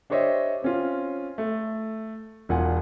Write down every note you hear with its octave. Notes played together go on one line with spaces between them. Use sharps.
D4 G4 C5 C#5 D#5 E5
C4 C#4 F4
A3
E1 E2 B2 F4 F#5 G#5